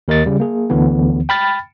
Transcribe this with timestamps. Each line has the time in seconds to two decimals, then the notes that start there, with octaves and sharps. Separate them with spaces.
0.08 D#2 A#4 D#5 A6
0.26 C#3 G3
0.40 A#3 G#4
0.70 D2 D3 E3 B3
1.29 G5 B5 F6 A6